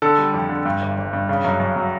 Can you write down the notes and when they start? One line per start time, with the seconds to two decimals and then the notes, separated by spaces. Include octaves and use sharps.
0.02 D3 A4
0.18 G3
0.34 F2
0.49 D3
0.65 G2
0.81 G1
0.97 G1
1.13 G2
1.29 C#3
1.44 F#2
1.60 F#2
1.76 F#3